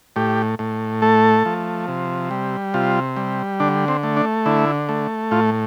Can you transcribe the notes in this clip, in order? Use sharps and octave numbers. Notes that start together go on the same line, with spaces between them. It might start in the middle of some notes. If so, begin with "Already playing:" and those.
A2 G4
A2
A3 A4
F3
C3
G3
C3 F4
G3
D3 D4
C4
A3
D4
D3 E4
A3
A2 F4